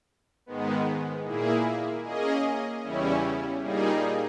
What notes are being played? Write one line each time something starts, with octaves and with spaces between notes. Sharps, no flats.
G#2 D#3 G#3 B3
A#2 A#3 E4 G#4
A#3 C#4 G#4 D#5
E2 C#3 G3 C#4 E4
A#2 G3 A#3 D#4 G#4